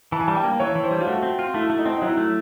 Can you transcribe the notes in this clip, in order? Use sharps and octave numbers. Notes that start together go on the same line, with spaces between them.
E3 A5
G#5
G3 A5
G5
A#3
E3 C#5
E3
C5
G3
F4
A3 F#4
C4
F4
A3 E4
A3
D#4
C4
D#4
F#3 E4
A3